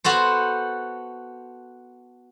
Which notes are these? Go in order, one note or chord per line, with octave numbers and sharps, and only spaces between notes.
B3 F#4 A4 C5